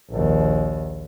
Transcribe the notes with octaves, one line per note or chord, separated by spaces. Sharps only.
A#1 D#2